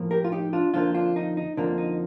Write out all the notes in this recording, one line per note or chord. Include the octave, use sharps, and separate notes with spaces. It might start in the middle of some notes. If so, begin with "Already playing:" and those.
Already playing: A2 F3 A#3
G4 A#4
F4
D#4 G4
D4 F4
F2 D3 F3 A#3 D4 F4
D4 F4
D#4
D#4
F2 D3 F3 A#3 D4
D#4